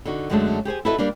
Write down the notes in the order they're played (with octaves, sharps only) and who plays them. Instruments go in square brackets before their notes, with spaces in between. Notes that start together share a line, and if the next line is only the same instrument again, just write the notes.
[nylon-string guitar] D3 D#4 F#4
F#2 D3 F#3 G#3 A3 A5
G4 G#4 C5 G#5
E4 F#4 A4 B4 D#5 E5
G3 A#3 D4